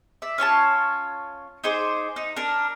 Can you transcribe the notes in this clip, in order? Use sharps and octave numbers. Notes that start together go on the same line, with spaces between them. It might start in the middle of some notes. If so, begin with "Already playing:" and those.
D5 E5
C#4 F4 C#5 A5
D#4 G#4 C5 D6
D#4
D4 A#4